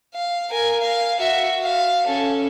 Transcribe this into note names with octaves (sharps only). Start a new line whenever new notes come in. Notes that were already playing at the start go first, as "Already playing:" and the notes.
F5
A#4 G#5
F5
F#4 E5
F5
C#4 A4